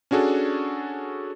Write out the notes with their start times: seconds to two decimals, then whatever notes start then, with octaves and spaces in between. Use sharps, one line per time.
0.11 C#4 D4 F#4 G#4 A4